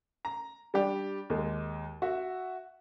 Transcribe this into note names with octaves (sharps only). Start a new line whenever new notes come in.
A#5
G3 D4 G4 D5
D#2 G#3
F#4 E5